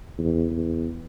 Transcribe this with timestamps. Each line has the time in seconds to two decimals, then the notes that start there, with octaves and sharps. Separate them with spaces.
0.18 E2
0.51 E2